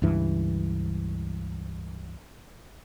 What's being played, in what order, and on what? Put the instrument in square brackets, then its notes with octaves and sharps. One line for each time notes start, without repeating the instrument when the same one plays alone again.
[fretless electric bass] C#2 G2 E3